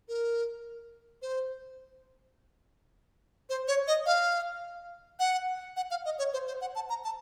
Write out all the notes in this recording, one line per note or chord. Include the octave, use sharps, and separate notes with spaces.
A#4
C5
C5
C#5
D#5
F5
F#5
F#5
F5
D#5
C#5
C5
C5
F#5
A5
A#5
A5